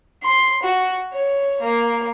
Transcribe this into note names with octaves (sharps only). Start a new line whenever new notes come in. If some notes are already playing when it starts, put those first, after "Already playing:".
C6
F#4
C#5
A#3